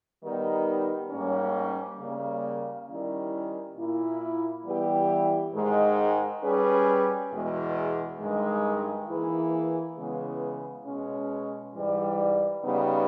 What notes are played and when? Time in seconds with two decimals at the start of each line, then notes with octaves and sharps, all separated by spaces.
0.23 D#3 G3 B3 D#4 G4
1.11 G#2 G3 A#3 C#4
2.00 C#3 G3 A#3
2.88 D#3 G3 C#4 E4 A#4
3.77 A#2 A#3 E4
4.65 E3 G3 B3 E4 G4
5.54 G#2 D#3 G#3
6.42 G3 C#4 G#4 B4
7.32 E2 B2 G#3
8.20 G2 D#3 G#3
9.08 E3 A#3 E4 G#4 B4
9.97 C#3 E3 G#3 B3
10.86 B2 G#3 C#4
11.74 G#2 E3 G3
12.63 C#3 G3 B3 D#4 G4